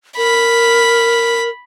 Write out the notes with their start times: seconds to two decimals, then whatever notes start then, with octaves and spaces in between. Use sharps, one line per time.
0.17 A#4 B5